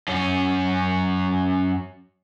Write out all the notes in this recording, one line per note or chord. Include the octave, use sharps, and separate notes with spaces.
F#2 C#4